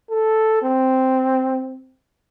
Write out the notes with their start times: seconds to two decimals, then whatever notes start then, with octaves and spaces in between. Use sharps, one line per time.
0.11 A4
0.63 C4